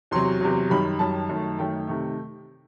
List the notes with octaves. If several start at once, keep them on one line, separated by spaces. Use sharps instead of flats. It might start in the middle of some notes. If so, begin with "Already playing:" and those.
E2 C3 F#3 C6
E2 C3 F#3
F#2 D#3 G3 B5
F#2 D#3 G3 A5
F#2 D#3 A3
F#2 D#3 A3 G5
C3 D#3 A3